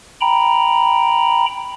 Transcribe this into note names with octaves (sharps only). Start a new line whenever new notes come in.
G5 A#5 B5